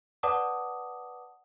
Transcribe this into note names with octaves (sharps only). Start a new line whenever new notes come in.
B4 D5 F#5 A5 D6 D#6